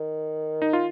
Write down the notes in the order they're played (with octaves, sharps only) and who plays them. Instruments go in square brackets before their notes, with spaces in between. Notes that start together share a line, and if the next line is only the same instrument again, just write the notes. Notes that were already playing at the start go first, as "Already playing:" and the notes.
Already playing: [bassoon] D#3
[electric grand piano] D#4
F4